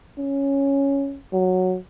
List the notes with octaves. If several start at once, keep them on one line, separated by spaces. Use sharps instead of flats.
C#4
F#3